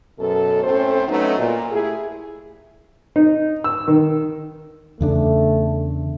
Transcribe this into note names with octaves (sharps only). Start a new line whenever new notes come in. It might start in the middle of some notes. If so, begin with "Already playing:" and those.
F#2 B2 A4
A2 C4 C#4 A4 C5
F#3 A3 B3 C#4 D#4
A#2
A3 E4 G4 G#4
D#4
E6
D#3
E2 C#3 A3 D4